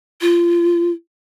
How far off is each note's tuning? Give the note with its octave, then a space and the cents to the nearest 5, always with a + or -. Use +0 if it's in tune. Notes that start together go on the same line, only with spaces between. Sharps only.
F4 -25